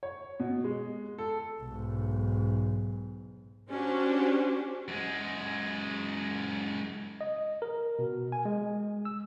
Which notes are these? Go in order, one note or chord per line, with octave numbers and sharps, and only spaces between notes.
C#5
B2
G#3
A4
B1 G#2
C#4 D4 F#4 G4 C5
F#2 G#3
D#5
A#4
B2
G#5
G#3
E6